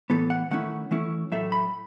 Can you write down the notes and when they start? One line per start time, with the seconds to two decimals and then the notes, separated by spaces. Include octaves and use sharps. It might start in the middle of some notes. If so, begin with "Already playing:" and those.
0.10 A2 E3 B3 A4
0.30 F#5
0.51 D#3 A3 C#4 E4 F#5
0.91 E3 A3 C#4 E4
1.32 A2 F#3 A3 E5
1.52 B5